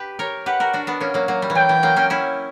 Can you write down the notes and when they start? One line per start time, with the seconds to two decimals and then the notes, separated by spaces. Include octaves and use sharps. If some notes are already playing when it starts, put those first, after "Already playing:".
Already playing: G4 B4
0.19 A#4 C#5
0.46 G4 B4 F#5
0.60 F#4 A#4
0.73 D4 F#4
0.87 B3 D4
1.00 A#3 C#4
1.14 F#3 A#3
1.28 F#3 A#3
1.42 G3
1.50 E3
1.55 F#3 G5
1.69 E3
1.83 F#3 A#3
1.96 A#3 C#4
2.10 C#4 E4